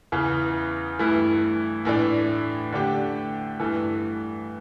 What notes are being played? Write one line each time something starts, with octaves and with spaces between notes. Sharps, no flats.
E2 C#3 E3
G2 E3 A3 E4
A2 E3 A3 D4
D3 A3 D4 G4
G2 E3 A3